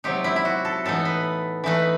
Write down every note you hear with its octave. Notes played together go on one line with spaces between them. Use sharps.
C3 F#3 C4 D#4 G4
E4
E4
F#4
A4
A2 E3 B3 D#4 A4
B4
E3 A3 D#4 B4